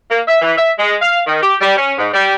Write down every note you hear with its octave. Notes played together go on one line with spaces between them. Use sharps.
A#3
E5
E3
E5
G#3
F5
D#3
G4
G3
C#4
G#2
G3